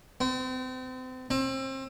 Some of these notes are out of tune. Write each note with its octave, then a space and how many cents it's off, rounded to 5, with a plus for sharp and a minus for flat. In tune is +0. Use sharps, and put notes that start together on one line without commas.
C4 -35
C4 +30